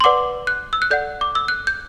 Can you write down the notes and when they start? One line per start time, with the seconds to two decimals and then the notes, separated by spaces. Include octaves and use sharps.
0.01 C6
0.04 B4 D5 F#5 D6
0.47 F#6
0.73 E6
0.82 F#6
0.90 A4 D5 F#5 G6
1.21 D6
1.35 E6
1.48 F#6
1.67 G6